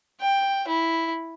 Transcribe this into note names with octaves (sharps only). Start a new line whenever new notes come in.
G5
E4